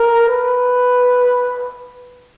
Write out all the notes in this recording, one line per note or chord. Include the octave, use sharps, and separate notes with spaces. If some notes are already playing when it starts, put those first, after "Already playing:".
Already playing: A#4
B4